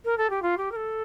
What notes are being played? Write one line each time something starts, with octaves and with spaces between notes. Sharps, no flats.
A#4
A4
G4
F4
G4
A#4
A4